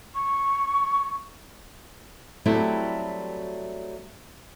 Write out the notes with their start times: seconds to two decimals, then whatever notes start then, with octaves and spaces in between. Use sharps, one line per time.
0.15 C#6
2.46 F#3 G3 A3 C4 E4 F#4